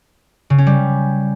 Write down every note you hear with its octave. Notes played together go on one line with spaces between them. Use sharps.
C#3
C#4
G3